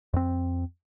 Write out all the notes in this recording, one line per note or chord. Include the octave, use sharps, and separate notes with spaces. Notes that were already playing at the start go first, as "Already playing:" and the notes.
F2 C4